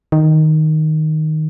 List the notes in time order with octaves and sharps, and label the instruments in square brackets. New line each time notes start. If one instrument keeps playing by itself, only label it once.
[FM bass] D#3